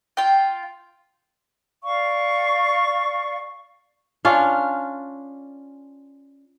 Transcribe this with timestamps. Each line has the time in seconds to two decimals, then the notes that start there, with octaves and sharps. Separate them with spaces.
0.17 F4 G5
1.82 D5 F5 C#6
4.25 C#4 D4 F4